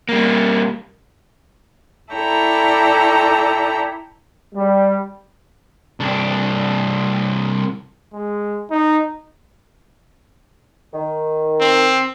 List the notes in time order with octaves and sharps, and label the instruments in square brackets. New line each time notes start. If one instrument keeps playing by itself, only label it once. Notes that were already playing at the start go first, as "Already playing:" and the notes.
[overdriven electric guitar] G3 A#3
[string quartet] E4 A4 D5 G5 A#5 C#6
[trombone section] G3
[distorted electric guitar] C2 D4
[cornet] G#3
D#4
[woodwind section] D#3
[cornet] C4